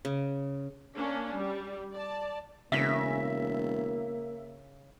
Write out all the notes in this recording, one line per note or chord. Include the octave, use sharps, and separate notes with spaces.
C#3
A#3 C#4 D4
G3
D5 A5
E1 C#3 A#3 E5 A#6 B6